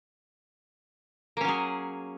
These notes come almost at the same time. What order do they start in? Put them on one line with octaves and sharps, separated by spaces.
A#3 C#4 F#3 G#4